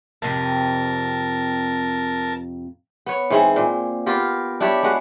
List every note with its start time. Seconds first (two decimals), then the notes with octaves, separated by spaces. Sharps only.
0.22 F2 C3 A#4 A5
3.06 B3 C#5
3.30 G#2 E3 C4 G#4
3.56 A#2
4.06 B3 F4 G4 A#4
4.60 D4 E4 G4 C#5
4.83 G#3 F#4 B4